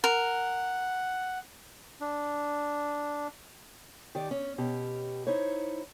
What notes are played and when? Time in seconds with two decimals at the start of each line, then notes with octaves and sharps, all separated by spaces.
0.04 A#4 F#5
2.01 D4
4.15 D#3 G4 D5
4.31 C#4
4.58 B2 C#4 G4
5.27 D#4 E4 C5 C#5